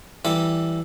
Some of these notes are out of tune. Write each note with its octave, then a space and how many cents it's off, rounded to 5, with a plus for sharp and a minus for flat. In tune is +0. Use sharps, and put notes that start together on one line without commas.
E3 +5 G3 +0 A4 +0